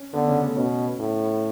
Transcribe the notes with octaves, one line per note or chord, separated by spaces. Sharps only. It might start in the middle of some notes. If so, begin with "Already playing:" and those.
Already playing: C#4
D3 B3
C#3 C#4
A3 A4
B2 C#4 C#5
A2